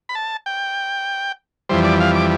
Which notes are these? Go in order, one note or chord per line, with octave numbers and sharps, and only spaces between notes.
B5
A5
G5
F2 E3 G3 C5
D5
F5
D6